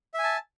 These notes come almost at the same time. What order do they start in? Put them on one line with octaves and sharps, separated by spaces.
E5 G#5 A5